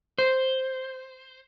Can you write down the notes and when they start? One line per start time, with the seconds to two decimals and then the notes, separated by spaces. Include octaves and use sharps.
0.18 C5